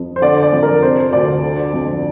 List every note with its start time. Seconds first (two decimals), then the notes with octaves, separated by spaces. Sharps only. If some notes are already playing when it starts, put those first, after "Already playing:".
Already playing: F2
0.16 C5
0.22 D3 D5
0.42 D5
0.52 F2
0.63 A#4
0.83 C3 C5
1.13 D2 D5
1.43 D3
1.73 F2